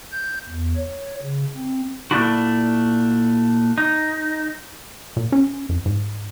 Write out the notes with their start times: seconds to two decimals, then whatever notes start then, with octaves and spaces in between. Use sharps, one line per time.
0.12 G6
0.47 E2
0.76 C#5
1.22 C#3
1.56 C4
2.11 A#2 G#3 A3 D4 E4 F#4
3.78 D#4
5.17 A#2
5.32 C#4
5.69 F2
5.86 G#2